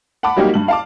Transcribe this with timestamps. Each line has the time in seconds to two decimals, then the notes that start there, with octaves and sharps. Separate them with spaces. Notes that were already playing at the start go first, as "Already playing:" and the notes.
0.23 F#5 A5 B5 D6
0.36 F#3 G3 A#3 D#4 F#4 G4
0.54 G2 F#7
0.68 F5 A5 D6